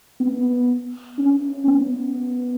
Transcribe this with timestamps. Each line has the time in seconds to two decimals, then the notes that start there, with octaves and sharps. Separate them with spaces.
0.20 B3
1.18 C#4
1.67 B3